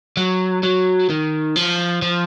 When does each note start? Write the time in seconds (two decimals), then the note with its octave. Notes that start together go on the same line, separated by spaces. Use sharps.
0.17 F#3
0.63 F#3
1.09 D#3
1.56 F3
2.02 F3